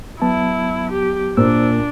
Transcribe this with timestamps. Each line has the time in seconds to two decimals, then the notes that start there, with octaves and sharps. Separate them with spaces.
0.22 F#3 B3 E4 A5
0.92 G4
1.37 A#2 D4 A#4 C5 E6